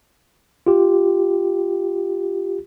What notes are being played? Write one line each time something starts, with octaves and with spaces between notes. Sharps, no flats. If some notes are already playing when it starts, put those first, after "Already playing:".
F4 G4